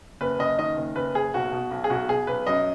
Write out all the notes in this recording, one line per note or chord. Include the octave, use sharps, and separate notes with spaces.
F#1 B4
F#1 D#5
D#3 D#5
F#1
F#1 B4
F#1 G#4
B1 F#4
B2
B1
G#4
B1 F#4
B2 G#4
B1 B4
F#2 D#5